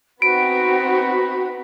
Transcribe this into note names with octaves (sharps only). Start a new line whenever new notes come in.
B3 C4 D#4 F#4 B5 D7